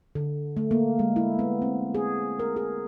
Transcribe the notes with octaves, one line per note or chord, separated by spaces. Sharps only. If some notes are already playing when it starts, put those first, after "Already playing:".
D3
A3
A#3
G#3
E4
B3
C4
G#4
A#4
G#4